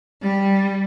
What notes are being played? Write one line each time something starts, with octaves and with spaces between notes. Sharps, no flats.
G3